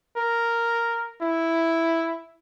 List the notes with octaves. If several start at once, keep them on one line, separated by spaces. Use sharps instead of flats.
A#4
E4